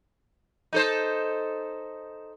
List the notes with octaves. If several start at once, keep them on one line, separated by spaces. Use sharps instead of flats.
D#4 A4 C5